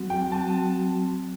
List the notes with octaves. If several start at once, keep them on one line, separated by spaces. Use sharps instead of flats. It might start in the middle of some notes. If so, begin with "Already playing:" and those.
Already playing: F#3 C4 F#4
G5
F#3 C4 F#4 A5